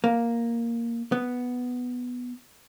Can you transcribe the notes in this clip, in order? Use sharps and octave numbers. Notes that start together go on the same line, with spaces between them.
A#3
B3